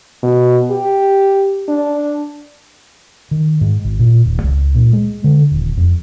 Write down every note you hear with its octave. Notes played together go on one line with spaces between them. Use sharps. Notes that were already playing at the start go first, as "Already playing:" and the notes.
B2
G4
D4
D#3
G#2
G#1
A#2
D#1
C#2
A#2
G#3
D3
D#1
F2